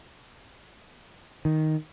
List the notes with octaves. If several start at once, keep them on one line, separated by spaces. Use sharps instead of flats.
D#3